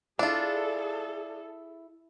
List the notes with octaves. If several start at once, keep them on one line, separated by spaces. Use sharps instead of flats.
D4 E4 F4 G#4 A4